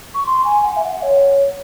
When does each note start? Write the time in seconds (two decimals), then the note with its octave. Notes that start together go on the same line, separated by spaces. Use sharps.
0.14 C#6
0.26 C6
0.44 G#5
0.65 F#5
0.76 E5
0.83 F#5
1.02 C#5